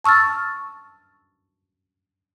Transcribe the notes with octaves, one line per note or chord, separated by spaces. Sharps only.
A5 C#6 E6 F6 A6